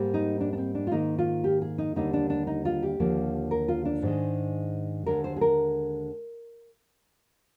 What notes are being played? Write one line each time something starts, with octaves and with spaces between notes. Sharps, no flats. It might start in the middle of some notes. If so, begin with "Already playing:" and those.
Already playing: G#2 G3 A#3
D#4
D4
D4
C4
D4
F4
G#2 D#3 A#3 D#4
F4
G4
G#4
D#4
D#2 D3 G3 A#3 D#4
D4
D4
D#4
F4
G4
D#2 D3 F3 A#3
A#4
F4
D4
G#2 D#3 G#3
D#2 D3 G#3 A#4
C5
G#4
A#4